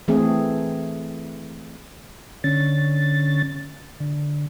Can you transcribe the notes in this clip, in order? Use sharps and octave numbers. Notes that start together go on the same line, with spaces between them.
E3 A3 C4 G#4
D3 C#4 A6
D3